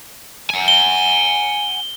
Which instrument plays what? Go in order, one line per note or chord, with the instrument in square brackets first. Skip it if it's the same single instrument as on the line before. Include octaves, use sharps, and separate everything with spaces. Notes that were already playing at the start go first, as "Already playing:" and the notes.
[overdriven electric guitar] F#5 G#5
[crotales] G7